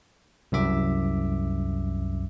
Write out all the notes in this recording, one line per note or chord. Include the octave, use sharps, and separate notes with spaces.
C2 F#2 E5 D6